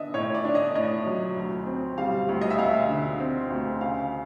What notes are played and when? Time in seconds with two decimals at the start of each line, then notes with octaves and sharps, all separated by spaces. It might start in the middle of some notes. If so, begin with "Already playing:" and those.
Already playing: B3 D4 D#5 E5
0.14 A2 C#5
0.35 D5
0.45 D4
0.55 D#5
0.75 A2 D#5
1.06 F#3
1.37 D2
1.66 C4
1.98 G3 F5
2.29 D2
2.42 D#5
2.50 E5
2.58 D2 F5
2.89 D3
3.20 C4
3.50 D2
3.81 C#3 F5